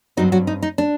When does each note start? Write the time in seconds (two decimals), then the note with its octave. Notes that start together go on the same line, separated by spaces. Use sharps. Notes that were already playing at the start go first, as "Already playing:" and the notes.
0.17 G2 F#3 C4 D#4
0.32 F#3 F#4
0.47 D#4
0.62 D#4
0.78 D4